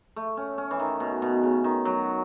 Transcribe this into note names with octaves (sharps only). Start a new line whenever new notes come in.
A3
C#4
C#4
E3
D#3
B2
B2
C#3
D#3
F#3